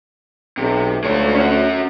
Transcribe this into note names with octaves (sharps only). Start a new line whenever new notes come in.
B1 C3
D2 G#3 C#5
C#4 F#4